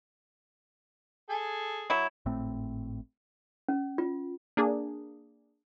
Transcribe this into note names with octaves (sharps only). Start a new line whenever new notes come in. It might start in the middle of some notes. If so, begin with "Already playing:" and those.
G#4 A4 G#5
F#3 E4
G#1 A2 A3 C4
C#4
F4
A#3 D4 G#4